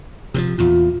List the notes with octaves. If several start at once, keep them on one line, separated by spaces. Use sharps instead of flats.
C3 E3 F3
E2 A#2 F4